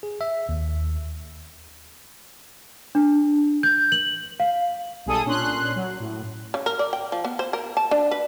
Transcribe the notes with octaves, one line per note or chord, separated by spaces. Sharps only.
G#4
E5
D#2
D4
G6
F#7
F5
B1 G3 G#4 A4 D#6
A#2 C#4 D4 C6 F#6
F#3
A2
C#3
A#4
D5
G5
F3
B3
C5
A#4
A5
D4
B4